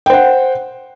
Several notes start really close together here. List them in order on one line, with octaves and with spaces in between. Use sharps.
G5 C5 F#5